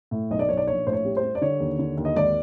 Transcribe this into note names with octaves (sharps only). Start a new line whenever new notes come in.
A2
B1 D#5
D5
B1 C#5
D5
A#1 C#5
A2 C5
C#5
G3
C5
G3
D5
D3 C#5
D#2
D3
D#2
D#5
G#1 D5